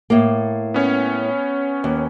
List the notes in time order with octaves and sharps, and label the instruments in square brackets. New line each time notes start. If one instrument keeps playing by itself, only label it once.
[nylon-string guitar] A2 A#3
[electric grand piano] B3 C#4 C#5
[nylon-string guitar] D#2